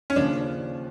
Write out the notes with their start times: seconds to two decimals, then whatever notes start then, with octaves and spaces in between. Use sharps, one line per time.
0.10 C#4
0.16 D#2 C#3 F3 D4